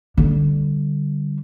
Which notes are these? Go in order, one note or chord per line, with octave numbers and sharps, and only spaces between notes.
D3 G3